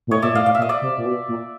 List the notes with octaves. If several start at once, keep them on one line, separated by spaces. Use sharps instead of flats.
A#2
A2 C#5 D#5
A#2 D5 E5
A2 D#5 F5
A2 F5
A#2 E5
D#5
D5 E5
C3
A#2
B2
A#2